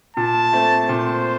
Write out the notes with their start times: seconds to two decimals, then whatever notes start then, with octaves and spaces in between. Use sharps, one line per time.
0.16 A#2 A5
0.53 A3 C4
0.89 A#2 C5